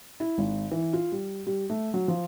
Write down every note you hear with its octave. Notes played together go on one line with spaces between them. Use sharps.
E4
G#1
E3
F4
G3
G3
A3
F#3
F3